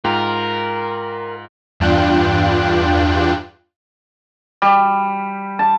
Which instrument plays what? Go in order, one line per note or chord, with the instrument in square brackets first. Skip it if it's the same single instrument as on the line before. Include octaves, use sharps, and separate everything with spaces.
[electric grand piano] G#2 F4 G5 [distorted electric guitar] A#4
[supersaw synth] E2 G2 D4 F4 G5 F#6
[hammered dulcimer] G3
A5